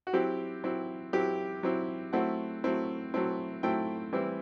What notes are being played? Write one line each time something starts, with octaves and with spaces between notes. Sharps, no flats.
F#4
F#3 C4 E4 G4
F#3 C4 E4
F#3 C4 E4 G4
F#3 C4 E4
F#3 A3 C4 E4 F#5
F#3 A3 C4 E4
F#3 A3 C4 E4
F#3 A3 C4 E4 G5
E3 G3 C4 E4